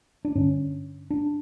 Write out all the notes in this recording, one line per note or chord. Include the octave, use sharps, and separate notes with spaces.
D4
G2 D3 C#4
D4